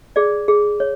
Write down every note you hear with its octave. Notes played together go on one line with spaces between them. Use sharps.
G#4 D5
G#4
C#5